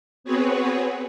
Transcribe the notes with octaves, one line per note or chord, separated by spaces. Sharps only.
B3 C4 F#4 G#4 B4 C#5